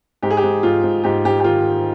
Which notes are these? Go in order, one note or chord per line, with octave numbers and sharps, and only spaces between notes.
G#2 G4
G#4
G4
G#2
G#2 F4
G#2
G#2 G4
G#2 G4
G4
D#3 F4